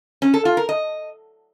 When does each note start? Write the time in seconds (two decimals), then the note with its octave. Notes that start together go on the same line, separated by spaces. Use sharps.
0.22 C#4
0.34 A4
0.45 F4
0.57 A#4
0.69 D#5